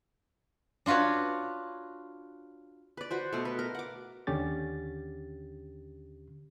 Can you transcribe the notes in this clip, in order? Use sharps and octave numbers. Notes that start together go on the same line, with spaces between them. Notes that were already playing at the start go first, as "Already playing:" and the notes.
D4 F4 F#4 B4 C#5
B4 D5
F#4 B4 C5
B2 A3
B4
A#4
F#5 D6
D#2 D3 C#4 G4 A6